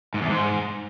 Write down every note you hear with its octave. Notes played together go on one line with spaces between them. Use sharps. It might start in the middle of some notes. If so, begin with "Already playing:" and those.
G#2
E2
G#2